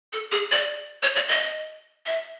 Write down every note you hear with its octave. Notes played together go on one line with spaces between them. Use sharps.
A4
G#4
D5
C#5
D5
D#5
E5